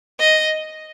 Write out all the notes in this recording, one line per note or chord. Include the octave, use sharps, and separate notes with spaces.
D#5